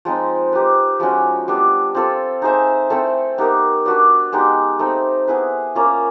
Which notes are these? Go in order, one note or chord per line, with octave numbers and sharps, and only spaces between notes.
F3 G#3 C4 D#4
D#4 G4 B4
F3 G#3 C#4 F#4
G3 B3 D4
C4 F4 A4
D#4 G#4 C5 E5
A3 C4 E4 A4
B3 D#4 G4 A#4
D4 F#4 B4 D5
G#3 B3 D#4 G4
A3 C4 D#4
B3 E4 G#4 B4
A#3 C#4 F4